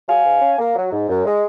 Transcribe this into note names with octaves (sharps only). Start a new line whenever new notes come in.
F#3 F5 G#5
G#2
C#4
A#3
F#3
G#2
F#2
G#3